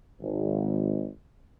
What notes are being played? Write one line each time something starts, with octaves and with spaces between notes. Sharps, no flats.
G#1